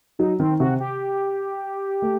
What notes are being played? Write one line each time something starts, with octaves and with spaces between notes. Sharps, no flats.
F#3 D#4
D#3 C4
C3 F#4
G4
A3